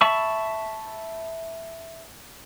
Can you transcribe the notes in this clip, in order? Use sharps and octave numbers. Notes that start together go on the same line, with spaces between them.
E5 A5 B5 C#6 E6